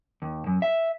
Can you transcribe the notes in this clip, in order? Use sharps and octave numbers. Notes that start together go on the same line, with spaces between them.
D#2
F#2
E5